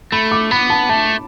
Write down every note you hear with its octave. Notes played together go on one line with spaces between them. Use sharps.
A3 B5
D6
B3 B5
A5
A3 A5